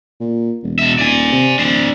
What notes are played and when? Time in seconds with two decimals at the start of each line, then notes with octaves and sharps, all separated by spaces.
0.20 A#2
0.63 E1
0.79 B2 E5
0.99 D#1 D5 G#5
1.32 C3
1.59 D1 D4 C5